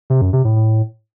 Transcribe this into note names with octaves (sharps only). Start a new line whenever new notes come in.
C3
F#2
C3
A2
A2